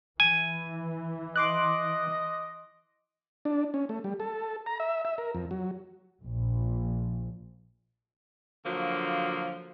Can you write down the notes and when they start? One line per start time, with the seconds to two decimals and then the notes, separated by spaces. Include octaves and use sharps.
0.20 E3 G#5
1.36 D#5 C6 D6 F#6
3.45 D4
3.74 C#4
3.89 A3
4.04 G3
4.20 A4
4.66 A#5
4.80 E5
5.05 E5
5.18 A#4
5.35 F2
5.51 F#3
6.24 A#1
8.65 D3 F3 F#3 A#3